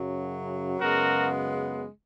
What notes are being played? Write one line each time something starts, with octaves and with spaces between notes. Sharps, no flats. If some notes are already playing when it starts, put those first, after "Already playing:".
Already playing: F#2 C#3 F#3
F#2 C#3 G#3 B3 F#4 A#4